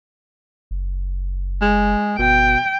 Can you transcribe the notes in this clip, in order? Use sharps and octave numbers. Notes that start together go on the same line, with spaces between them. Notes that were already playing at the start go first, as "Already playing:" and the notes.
F#1
G#3
G1 B2 G5